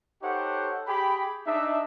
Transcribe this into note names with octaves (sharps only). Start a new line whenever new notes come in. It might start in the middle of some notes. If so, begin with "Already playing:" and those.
D#4 G4 A4 C5 C#5 F#5
G4 G#4 G5 B5
D4 D#4 G#4 D#5 E5